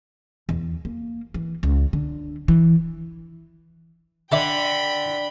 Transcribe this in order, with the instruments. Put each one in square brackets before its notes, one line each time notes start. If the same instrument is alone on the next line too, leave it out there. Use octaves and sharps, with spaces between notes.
[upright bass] E2
A#3
E3
C#2
D3
E3
[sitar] D3 [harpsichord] D5 E5 A5 [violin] G5 B5